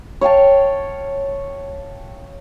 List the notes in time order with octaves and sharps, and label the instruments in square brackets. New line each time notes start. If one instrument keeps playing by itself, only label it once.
[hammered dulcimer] C#5 F5 G5 A5